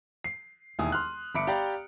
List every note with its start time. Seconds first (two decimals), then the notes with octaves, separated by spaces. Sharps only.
0.24 C7
0.79 E1 D#2 E4 G#5 D#6
0.92 C6 F6 F#6
1.35 G1 E5 B5 D6 C#7 D7
1.47 G4 D5 F5 G5 A#5 B5